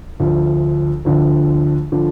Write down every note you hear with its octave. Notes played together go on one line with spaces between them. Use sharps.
D2 D3 F3
D2 D3 F3
D3 F3